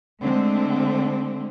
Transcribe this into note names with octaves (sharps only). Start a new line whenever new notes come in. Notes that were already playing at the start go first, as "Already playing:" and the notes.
D3 G#3 A3 C4